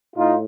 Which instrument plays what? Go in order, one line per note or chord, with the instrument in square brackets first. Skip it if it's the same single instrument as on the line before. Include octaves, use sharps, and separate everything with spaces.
[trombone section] A2 D#4 F4